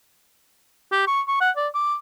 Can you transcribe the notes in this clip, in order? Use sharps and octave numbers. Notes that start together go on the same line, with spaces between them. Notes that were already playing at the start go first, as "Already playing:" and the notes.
G4
C#6
C#6
F#5
D5
D6